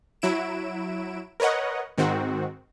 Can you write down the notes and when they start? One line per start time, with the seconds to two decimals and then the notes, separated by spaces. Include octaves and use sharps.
0.22 F#3 E4 D7 E7
1.40 A#4 B4 C#5 D#5 F#5
1.98 G#2 D#3 C4 F#4